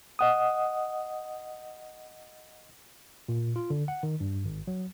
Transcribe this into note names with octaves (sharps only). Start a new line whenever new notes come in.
D#5 F#5 D#6
A#2
F4
D3
F#5
D#3
G2
G#1
F#3